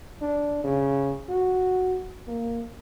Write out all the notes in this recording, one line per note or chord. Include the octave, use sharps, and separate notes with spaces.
D4
C#3
F#4
A#3